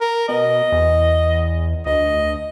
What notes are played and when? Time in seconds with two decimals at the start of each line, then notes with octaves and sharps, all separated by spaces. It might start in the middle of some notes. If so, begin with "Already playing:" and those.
0.01 A#4
0.29 B2 D#5
0.72 E2
1.86 D2 D#5